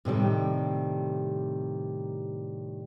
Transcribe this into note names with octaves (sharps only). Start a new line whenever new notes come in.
A2 C3 D#3 G3